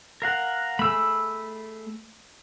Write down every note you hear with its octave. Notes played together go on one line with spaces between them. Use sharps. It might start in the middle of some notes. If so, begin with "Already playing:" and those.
A#4 F5 F#5
A3 G#4 B5 E6